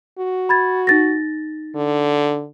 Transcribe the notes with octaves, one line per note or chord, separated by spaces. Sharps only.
F#4
B5 G#6 A6
D#4 A6 A#6
D3